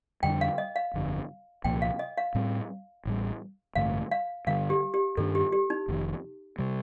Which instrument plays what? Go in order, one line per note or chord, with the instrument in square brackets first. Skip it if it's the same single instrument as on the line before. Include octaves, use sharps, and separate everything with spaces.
[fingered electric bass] F2 D3 G3 D4 [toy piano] G5
[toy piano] F5
D#5
F5
[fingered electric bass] G1 F2 D3
[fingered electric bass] C2 A#2 F3 A#3 [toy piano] G5
[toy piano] F5
D#5
F5
[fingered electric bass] A2 G3 C4
A1 A2 G3
[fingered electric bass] A1 G2 D3 A3 [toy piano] F5
[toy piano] F5
[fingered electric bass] G2 D3 G3 [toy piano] F5
[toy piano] G4
G4
[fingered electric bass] G2 D#3 A#3 D4 [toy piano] A4
[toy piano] G4
G4
D#4
[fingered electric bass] F1 F2 D#3
C3 G3